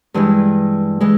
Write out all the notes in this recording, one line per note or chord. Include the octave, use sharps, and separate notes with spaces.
G2 E3 G#3
E3 G#3